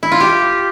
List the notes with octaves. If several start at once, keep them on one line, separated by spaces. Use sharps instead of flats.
E4
F4
G4